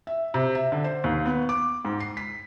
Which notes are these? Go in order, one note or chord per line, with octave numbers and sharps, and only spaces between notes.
E5
C3
E5
D3
C5
D#2
B3
D6
G#2
C7
B6